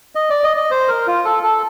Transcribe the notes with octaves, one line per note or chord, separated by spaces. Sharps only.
D#5
D5
D#5
D#5
C5
A#4
F4
A4
A4